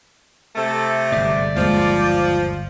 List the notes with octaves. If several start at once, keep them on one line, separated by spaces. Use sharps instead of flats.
C3 A3 A4
G1 G#2 D5
D#2 F3 G#3